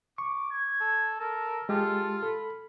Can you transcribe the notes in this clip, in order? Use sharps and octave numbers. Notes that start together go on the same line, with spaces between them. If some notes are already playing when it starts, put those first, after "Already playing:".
C#6 D6
G#6
A4
A4 A#4
G#3 F4 G4 A4
A4 B5